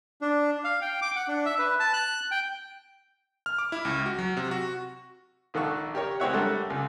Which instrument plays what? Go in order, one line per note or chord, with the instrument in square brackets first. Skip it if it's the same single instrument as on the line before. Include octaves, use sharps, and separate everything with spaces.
[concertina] D4
F5
G5
D6
F#5
D4
E5
B4
A5
F#6
G5
[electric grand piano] F6
D6
E4
C#2
F#4
F#3
C3
F#4
[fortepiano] A#1 D#3 A4 F#5 C#6
G4 A#4 C#5
G#3 C4 E4 C#5 E5 F#5
G3 A3 D4 A4 A#4 F#5
C#2